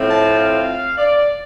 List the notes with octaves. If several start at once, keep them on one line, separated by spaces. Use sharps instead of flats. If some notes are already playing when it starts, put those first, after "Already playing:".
Already playing: A2 F3 C4 F4
A5
F5
D5